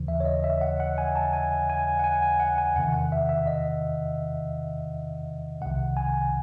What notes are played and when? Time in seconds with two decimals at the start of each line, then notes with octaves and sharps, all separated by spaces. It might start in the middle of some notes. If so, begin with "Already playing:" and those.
Already playing: D#2 C#3 E3
0.08 E5
0.20 C#5
0.26 D#5
0.44 E5
0.61 F#5
0.80 F#5
0.98 G#5
1.16 A5
1.33 G#5
1.69 G#5
1.99 F#5
2.04 G#5
2.22 G#5
2.40 F#5
2.58 G#5
2.76 E2 C3 D#3 F#5
2.94 F#5
3.12 E5
3.29 E5
3.47 D#5
5.61 C2 C3 D#3 F#5
5.97 G#5